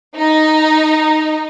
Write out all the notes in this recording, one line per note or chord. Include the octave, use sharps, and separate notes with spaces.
D#4